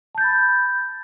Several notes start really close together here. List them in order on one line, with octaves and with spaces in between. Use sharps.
A5 G6 A6 B5